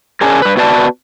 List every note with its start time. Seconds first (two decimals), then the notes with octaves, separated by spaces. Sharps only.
0.21 C#4 D4 G#4 A#4
0.42 G2 B4
0.57 B3 F#4 B4 D5 G5 A5